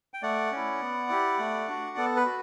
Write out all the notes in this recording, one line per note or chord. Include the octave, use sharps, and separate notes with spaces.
G5
A3 D5 F#5
C#4 E4
B3
E4 G4
A3
D4 F#4
B3 A4
B4
F#4